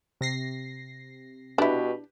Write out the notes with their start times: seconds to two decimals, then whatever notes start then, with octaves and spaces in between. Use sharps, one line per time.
0.21 C3 A#6 C7
1.58 B2 D4 E4 G4 B4